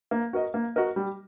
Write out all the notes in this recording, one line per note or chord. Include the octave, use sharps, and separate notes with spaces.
A#3
F#4 A#4 D#5
A#3
F#4 A#4 D#5
G3